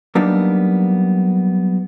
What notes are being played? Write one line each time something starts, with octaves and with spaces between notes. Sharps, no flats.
F#3 G3 A#3 B3 D4 D#4